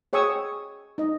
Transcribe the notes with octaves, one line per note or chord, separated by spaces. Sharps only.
G#4 C#5 G5 C#6 D#6 E6
D#4 D#5